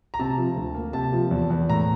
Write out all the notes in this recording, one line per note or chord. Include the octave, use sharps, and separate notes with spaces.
A#5
C3 A5
F3
D2
A#3
C3 A5
F3
E2
E2
A2 A#5